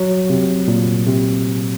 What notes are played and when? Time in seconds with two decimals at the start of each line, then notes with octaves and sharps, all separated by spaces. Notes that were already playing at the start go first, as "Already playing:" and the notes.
Already playing: F#3
0.30 C3
0.68 A#2
1.06 C3